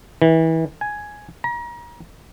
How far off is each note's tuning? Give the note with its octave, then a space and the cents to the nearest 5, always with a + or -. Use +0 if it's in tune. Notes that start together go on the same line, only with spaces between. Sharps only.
E3 -30
G#5 +5
A#5 +35